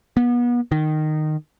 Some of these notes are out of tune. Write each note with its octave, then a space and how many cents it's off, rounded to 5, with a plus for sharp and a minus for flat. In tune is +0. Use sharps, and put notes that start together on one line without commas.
B3 -35
D#3 -15